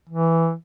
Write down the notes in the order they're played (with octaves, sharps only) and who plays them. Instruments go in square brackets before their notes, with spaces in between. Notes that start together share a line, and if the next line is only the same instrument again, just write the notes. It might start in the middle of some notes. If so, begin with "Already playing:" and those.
[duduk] E3